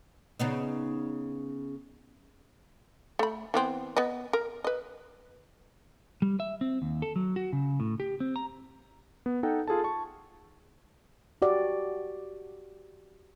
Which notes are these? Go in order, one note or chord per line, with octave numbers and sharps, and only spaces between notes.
C#3 B3 D#4
A3 B5
E3 B3 C4
B3 B4 D#5
A#4
B4 D#5
G3
E5
C4
D#2
A4
F#3
F#4
C#3
A2
G4
C4
A#5
B3
D#4 A4 F#5 G5
F4 G#4 A4 A5
A5 C#6
F#4 G4 D5